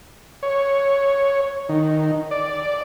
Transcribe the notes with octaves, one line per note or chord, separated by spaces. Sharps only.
C#5
D#3
D5